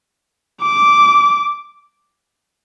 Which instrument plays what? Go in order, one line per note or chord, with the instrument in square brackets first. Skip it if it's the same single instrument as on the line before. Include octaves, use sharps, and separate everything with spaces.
[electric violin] D6